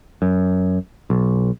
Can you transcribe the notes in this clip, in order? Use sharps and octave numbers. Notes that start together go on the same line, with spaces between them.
F#2
B1